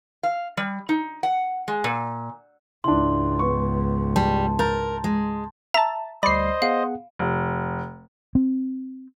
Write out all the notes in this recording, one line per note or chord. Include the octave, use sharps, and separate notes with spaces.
F5
G3
D#4
F#5
G#3
A#2
C#2 G#2 D4 E4 C6
B3 C#6
G3 A5
A#4 A#5 G6 A6
G#3
E5 A5 A#5
D2 G3 C5 D5 D#5 B5 C7
B3 G#4 F5 F#5
F1
C4